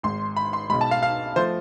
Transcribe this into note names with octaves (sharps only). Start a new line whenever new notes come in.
G#1 G#2 G#3 C6
B5
C6
B1 B2 G#3 B5
A5
F5
F5
F3 A3 C5